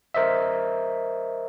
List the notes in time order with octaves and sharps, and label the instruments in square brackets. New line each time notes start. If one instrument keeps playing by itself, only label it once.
[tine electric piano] A#4 C5 D#5 E5